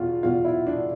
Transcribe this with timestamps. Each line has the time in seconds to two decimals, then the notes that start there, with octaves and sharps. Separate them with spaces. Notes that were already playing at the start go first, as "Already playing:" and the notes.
Already playing: E2 B2 F4
0.23 E2 B2 F4
0.45 E4
0.67 D4